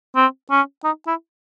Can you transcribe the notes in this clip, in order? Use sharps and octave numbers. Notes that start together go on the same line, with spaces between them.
C4
C#4
D#4
E4